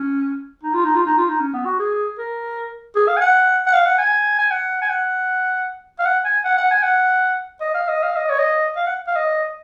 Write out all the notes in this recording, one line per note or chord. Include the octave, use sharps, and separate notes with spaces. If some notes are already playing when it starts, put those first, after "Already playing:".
Already playing: C#4
D#4
F4
D#4
F4
D#4
F4
D#4
C#4
B3
F#4
G#4
A#4
G#4
F5
G#5
F#5
F#5
F5
F#5
G#5
G#5
F#5
G#5
F#5
F5
F#5
G#5
F#5
F#5
G#5
F#5
D#5
F5
D#5
F5
D#5
C#5
D#5
F5
F#5
F5
D#5